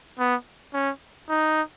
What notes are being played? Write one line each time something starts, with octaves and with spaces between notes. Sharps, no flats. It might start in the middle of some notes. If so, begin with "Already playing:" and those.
B3
C#4
D#4